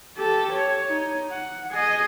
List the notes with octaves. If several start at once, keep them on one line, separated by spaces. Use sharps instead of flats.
G4 A4
C#5
D#4
F#5
G#4 D#5